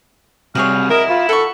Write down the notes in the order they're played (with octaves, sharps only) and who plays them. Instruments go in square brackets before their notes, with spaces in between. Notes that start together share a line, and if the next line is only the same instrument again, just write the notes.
[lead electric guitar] C3 G3 [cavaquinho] F#4 G#4 C#5 [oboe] F5
[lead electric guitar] E4 [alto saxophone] A#4 [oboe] D#5
[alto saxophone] F4 [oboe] B5
[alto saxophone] A4 [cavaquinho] F#5 C#6